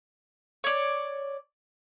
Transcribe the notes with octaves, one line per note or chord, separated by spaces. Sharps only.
C#5 D5